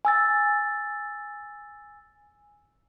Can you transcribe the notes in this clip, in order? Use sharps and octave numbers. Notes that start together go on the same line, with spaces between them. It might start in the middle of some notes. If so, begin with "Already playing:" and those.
G#5 E6 A6